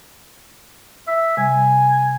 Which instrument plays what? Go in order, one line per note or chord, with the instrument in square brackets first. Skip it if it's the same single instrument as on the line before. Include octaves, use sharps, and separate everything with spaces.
[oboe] E5
[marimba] C3 G3 [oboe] G#5